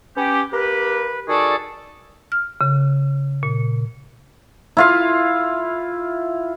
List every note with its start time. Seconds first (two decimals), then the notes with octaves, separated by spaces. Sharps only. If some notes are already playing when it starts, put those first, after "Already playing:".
0.17 B3 C#4 G4
0.52 A#3 G4 B4
1.28 D#3 F#4 G#4 A4 D5
2.32 F6
2.61 C#3
3.43 A#2
4.77 E4 F4 F5